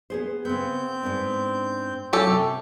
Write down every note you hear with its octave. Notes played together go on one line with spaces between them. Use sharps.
B3 G#4 C5
C#3 B3 C4 G6
G#2 B3 D4
F#3 C#4 G4 A4
C3